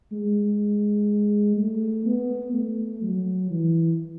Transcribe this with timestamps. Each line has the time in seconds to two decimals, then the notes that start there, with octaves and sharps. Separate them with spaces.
0.12 G#3
1.57 A3
2.06 B3
2.54 A3
3.02 F#3
3.50 E3